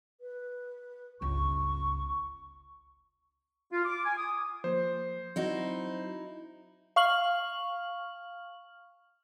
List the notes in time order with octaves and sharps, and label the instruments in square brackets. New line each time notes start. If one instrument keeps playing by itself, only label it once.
[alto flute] B4
[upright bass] G1 C#2 [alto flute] C#6
[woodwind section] F4
D6
G#5
D#6
[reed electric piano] F3 A#3 [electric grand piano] C5
[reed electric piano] F#3 C4 F#4 [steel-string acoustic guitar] D#4 E4
[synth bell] F5 C#6 F6 F#7